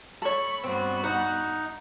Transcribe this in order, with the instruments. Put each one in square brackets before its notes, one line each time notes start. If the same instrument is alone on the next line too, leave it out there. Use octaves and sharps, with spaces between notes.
[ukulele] A4 C#5 [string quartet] B5 C#6
[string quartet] G2 B3 F#4 [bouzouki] C4
[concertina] D#4 [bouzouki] F#5